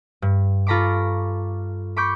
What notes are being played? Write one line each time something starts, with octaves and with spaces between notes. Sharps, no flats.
G2
F4 A4 A#5 B5 C#6 D6
B5 C#6 D6 G6 C#7